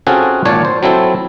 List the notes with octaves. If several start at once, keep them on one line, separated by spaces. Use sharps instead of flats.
C4 C#4 F4 F#4 G#4 A4
G#1 A#2 C#5 D5 A5
C5
F#3 C4 E4 A4